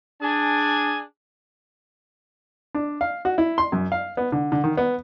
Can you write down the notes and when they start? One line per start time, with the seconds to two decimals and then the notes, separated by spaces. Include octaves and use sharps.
0.22 D4 G#4 G#5
2.75 D4
3.01 F5
3.25 F#4
3.38 E4
3.58 C6
3.72 F#2
3.92 F5
4.17 B3
4.32 D3
4.52 D3
4.64 D#3
4.77 B3